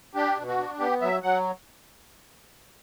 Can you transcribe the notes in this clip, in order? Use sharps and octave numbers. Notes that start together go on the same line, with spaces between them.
D4 G4
B2
F#4
D4
B3 G4
F#3 E5
F#3 F#5